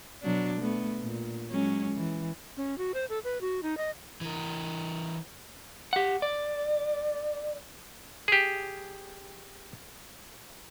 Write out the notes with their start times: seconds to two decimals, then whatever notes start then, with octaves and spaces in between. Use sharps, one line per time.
0.23 B2 F#3 D4
0.61 A3 B3
1.01 A#2
1.50 F#3 G#3 C#4
1.94 E3
2.57 C#4
2.78 F#4
2.94 C5
3.09 A4
3.24 B4
3.41 F#4
3.63 D#4
3.77 D#5
4.21 E3 A#4
5.93 G4 F#5
6.22 D5
8.28 G4 G#4